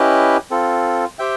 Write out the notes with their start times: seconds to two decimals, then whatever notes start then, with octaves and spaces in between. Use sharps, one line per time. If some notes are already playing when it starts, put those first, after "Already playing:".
Already playing: C#4 E4 G4 B4 D#5
0.51 C4 F4 A4
1.19 G4 C5 E5 G5